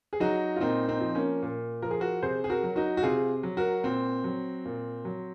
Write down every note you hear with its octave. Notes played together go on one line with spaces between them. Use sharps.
G#4
F#3 D#4 F#4
F4
A#2 C4 D#4
C4 D#4
F3
A#3 C#4
A#2
F3 A#4
G#4
F#4 A#4
C3 G#4 C5
G#4
F#4 A#4
F#3
D#4 F#4
F#4
C3 F4 G#4
F#3
F#4 A#4
A#2 C4
F#3
A#2
F#3